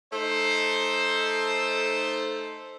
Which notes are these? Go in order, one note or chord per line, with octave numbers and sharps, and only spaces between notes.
A3 D#4 A4 C5